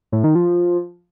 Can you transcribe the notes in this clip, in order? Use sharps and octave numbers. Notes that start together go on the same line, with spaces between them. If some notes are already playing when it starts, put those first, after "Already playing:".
A2
D#3
F3